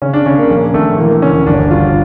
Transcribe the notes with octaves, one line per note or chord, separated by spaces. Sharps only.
C#3 C#4
D4
C#3 C#4
A#3
A#1 A#3
A#1 A3
E3 A#3
D2 C#4
G1 D4
G1 F4